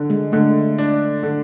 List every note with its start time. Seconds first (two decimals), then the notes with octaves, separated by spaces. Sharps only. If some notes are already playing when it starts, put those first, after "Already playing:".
Already playing: D3
0.10 G#3
0.32 D3 A3
0.78 D4
1.23 D3